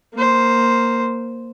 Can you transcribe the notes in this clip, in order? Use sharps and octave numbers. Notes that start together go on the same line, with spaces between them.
A#3 C5